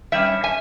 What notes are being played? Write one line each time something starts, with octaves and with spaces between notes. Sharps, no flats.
G2 G3 C#4 E5
E5 G#5